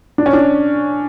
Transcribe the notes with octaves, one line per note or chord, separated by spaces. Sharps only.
D4
C#4
D4